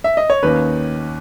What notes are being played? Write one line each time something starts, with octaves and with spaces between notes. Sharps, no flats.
E5
D#5
C#5
D#2 D#3 A#3 C#4 B4